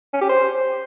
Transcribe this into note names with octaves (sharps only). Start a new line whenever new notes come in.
C#4
G4
C5